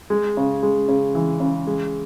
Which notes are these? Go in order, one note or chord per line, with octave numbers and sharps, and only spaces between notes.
G#3
C#3
G#3
C#3
E3
C#3
G#3